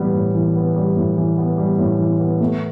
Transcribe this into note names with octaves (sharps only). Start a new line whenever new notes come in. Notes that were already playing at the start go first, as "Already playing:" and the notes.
Already playing: A2 E3 G3 B3
A2
E3
B3
G3
A2
E3
B3
G3
A2
E3
B3
A3